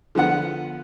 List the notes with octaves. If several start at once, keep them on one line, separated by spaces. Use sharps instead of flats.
D3 F3 B3 F#5